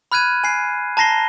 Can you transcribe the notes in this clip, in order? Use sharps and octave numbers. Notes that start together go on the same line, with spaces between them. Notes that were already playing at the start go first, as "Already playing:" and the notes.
B5 F6 F#6 G#6 D#7
G#5 C7
A5 A#5 A#6 C7 G7